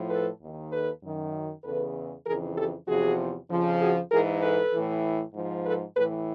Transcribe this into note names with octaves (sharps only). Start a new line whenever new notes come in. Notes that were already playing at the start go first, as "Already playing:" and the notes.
Already playing: A2 F3
A4 B4
D#2 D#3
A4 B4
F#2 D#3
E2 C#3 E3 A4 B4
F2 C#3 E3 G#4 A#4
G4 A4
E2 C3 F3 F#4 G#4
F2 C#3 F3
F#4 G#4
G#2 E3 G#4 A#4
A4 B4
A2 E3
G#2 F3
A4 B4
A2 E3 A4 B4